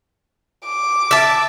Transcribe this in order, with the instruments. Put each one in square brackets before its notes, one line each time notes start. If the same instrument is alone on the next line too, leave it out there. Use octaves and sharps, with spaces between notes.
[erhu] D6
[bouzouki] E5 A5